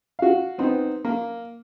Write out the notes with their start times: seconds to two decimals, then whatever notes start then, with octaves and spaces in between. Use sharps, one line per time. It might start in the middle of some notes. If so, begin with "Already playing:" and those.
0.19 F#4 F5
0.58 B3 C4 D#4
1.05 A#3